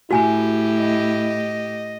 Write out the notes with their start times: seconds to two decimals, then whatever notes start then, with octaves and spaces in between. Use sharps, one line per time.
0.11 A2 E4 F#4 G4 G#5 B5
0.77 D#5